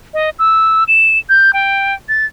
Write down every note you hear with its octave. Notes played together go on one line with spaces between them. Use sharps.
D#5
E6
E7
G6
G5
A6